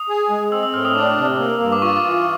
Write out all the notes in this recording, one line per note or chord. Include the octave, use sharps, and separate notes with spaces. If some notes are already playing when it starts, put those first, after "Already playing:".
Already playing: D#6
G#4
G#3
C4 E6
E6
A2 F6
D#6
D4 D6
C3
A#3
G2
D6
F4 C#6
E3